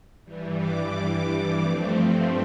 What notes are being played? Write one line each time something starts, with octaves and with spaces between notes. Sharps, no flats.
G2 E3 G3
D6
G2 F3 A3 C4